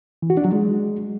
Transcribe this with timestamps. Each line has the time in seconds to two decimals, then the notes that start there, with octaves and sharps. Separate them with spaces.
0.22 E3
0.30 F#4
0.37 D4
0.45 F#3
0.52 G#3